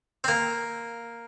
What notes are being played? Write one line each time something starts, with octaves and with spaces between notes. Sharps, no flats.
C4
A#3